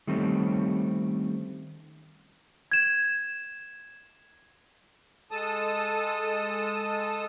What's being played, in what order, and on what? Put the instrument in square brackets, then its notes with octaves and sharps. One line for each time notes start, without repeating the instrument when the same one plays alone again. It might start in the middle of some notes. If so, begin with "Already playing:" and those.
[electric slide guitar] D#3 G3 A3 C4 C#4
[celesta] G#6 E7
[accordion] G#3 A4 A5 D#6